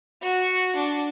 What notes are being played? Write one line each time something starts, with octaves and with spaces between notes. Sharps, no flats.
F#4
D4